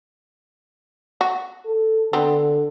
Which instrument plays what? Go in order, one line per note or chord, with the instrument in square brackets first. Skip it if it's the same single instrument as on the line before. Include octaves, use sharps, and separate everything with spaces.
[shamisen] F#4
[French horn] A4
[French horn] D3 [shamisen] B3 C4